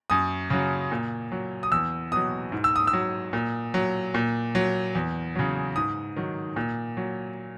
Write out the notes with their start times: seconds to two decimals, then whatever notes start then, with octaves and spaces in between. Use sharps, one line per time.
0.10 F#2 D#6
0.50 C#3 F#3
0.92 A#2
1.32 F#3
1.63 D#6
1.72 E2 E6
2.12 B2 F#3 D#6
2.52 G#2
2.64 E6
2.76 D#6
2.87 E6
2.93 F#3
3.33 A#2
3.74 F#3
4.14 A#2
4.55 F#3
4.95 E2
5.36 C#3 F#3
5.75 G#2 D#6
6.16 D#3 F#3
6.56 A#2
6.97 F#3